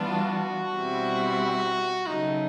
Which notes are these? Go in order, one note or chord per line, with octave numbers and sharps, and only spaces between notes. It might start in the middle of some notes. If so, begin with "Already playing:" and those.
Already playing: E3 G3 B3 D4 F4
F#4
B2 G3 C4 E4
C#3 F#3 A3 D#4